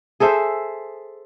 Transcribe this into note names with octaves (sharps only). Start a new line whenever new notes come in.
G#4 A4 C5 E5